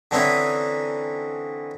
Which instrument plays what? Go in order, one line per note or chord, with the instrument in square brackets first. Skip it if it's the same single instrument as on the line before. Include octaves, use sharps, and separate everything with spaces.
[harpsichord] D3 E3 C4 C#4 D#4 E4